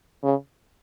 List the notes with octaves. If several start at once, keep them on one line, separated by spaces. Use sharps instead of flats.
C#3